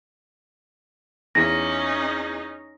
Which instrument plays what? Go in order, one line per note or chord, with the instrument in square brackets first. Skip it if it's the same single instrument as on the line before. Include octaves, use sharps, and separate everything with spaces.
[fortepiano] E2 [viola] C#4 D#4 [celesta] A#6